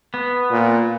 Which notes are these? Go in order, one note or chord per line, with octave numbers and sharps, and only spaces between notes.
B3
A#2